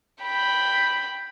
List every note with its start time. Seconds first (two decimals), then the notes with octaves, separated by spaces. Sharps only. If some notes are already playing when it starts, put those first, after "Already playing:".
0.22 G5 B5